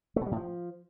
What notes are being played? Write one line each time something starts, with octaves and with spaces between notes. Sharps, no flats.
A3
B2
G3
A2
F3